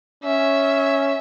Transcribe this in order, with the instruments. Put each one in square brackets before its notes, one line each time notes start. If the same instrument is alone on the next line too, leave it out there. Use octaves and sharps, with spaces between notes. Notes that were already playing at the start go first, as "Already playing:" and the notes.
[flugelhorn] C#4 [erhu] E5